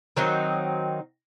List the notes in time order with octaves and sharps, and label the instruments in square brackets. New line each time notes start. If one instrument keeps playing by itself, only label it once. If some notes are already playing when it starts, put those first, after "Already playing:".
[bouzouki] D#3 F#3 C4 D#4